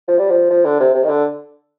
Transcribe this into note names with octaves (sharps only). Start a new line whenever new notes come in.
F3
G3
F3
F3
D3
C3
C3
D#3
D3